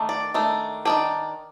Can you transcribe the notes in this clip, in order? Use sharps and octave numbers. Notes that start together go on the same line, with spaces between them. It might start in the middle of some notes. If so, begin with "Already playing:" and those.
Already playing: D#3 A3 D4
D5
D#3 A3 D4
D#3 A3 D4 D5